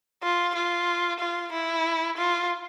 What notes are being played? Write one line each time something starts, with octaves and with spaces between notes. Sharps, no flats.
F4
F4
F4
E4
F4